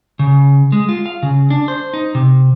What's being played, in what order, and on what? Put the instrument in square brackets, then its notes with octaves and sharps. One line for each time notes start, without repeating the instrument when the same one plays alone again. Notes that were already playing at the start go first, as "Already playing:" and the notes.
[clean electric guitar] C#3
G#3
F4
F5
C#3
D4
C5
D#4
C3